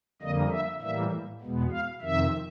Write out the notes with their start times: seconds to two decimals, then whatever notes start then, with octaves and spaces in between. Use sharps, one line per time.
0.22 F2 D3 G3 A#3 D#5
0.51 E5
0.82 A2 E3 G3 A#3 E5
1.41 E2 B2 G#3 B3
1.71 F5
2.01 F2 C3 D#3 E5